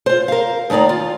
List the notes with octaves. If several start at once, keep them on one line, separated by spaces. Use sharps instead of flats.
F4 C5
A#4 F5
D#2 A2 D#4 D5 A#5
F4